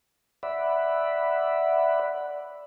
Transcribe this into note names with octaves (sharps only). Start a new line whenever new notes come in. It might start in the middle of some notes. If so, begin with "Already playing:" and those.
D5 E5 F#5 B5